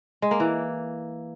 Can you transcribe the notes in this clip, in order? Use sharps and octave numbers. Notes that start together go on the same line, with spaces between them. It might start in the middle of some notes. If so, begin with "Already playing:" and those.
G#3
A#3
E3